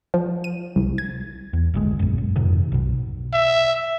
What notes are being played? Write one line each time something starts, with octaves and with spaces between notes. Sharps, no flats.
F3
D#7
C2
G#6
E2
G#1 D2 G#3
A#1 F#2
F#2
F2 G#2 C3 D#3
B1 B2
E5